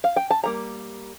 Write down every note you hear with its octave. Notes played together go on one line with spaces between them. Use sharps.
F5
G5
A5
D#3 G3 A#3 A#5